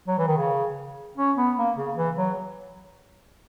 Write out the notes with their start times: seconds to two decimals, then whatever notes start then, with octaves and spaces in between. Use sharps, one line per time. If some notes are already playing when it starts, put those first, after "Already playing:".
0.08 F#3
0.18 E3
0.27 D#3
0.37 C#3
1.17 C#4
1.37 B3
1.57 A#3
1.77 C#3
1.96 E3
2.17 F#3